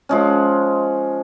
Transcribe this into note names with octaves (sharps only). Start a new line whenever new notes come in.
F3 G#3 C#4